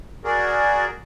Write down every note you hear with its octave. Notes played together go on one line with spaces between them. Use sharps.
F#4 G#4 A#4 D5